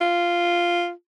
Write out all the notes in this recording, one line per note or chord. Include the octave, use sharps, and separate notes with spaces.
F4